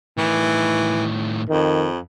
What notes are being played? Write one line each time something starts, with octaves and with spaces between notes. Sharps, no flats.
A2 D#3 E3
F2 D#3